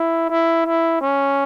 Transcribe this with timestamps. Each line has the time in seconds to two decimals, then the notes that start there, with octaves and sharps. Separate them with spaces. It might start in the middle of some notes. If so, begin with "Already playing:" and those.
Already playing: E4
0.30 E4
0.66 E4
1.02 C#4